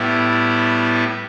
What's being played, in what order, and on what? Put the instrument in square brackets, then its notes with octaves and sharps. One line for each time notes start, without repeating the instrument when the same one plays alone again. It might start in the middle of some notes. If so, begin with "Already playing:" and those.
Already playing: [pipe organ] A2 G3 B3 E4